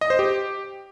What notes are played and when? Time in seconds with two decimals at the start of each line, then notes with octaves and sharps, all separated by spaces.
0.01 D#5
0.10 C5
0.19 G4